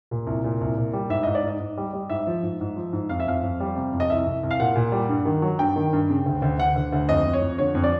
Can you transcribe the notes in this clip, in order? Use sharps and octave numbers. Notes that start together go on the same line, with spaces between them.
A#2
C2
A#2
C2
A#2
G3
G#2 E5
G#2 D#5
D5
G#2 D#5
G#2
G3
G3
G#2 E5
F3
G#2
G#2
F3
G#2
F2 F5
E5
F2 F5
F2
G3
C3
F2
D#5
C2 E5
C2
C2
F5
A#2 F#5
A#2
G3
G2
D#3
F#3
G2 G5
D#3
G2
C#3
D2
D2
D2 F#5
D2
D2
F2 D#5
F2
C#5
F2
D3 C#5
F2
D5